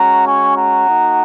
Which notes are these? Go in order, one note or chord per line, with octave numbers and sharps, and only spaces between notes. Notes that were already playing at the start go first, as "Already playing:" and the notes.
Already playing: G#3 C#4 F#4 F#5 A#5
G#5 C#6
F#5 A#5
A#3 D#4 F#4